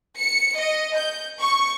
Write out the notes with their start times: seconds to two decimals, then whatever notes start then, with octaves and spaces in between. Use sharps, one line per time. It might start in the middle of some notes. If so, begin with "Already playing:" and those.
0.18 C#7
0.57 D#5
0.96 G6
1.41 C#6